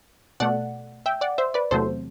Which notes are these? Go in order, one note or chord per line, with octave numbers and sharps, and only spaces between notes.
B2 A3 D5 F#5
E5 G5
D5 F#5
C5 E5
B4 D5
E2 C3 F#3 A3 A4 C5